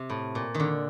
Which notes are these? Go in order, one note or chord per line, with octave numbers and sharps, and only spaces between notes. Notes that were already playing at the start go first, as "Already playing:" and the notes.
Already playing: C3
A2
A#2
D#3
D3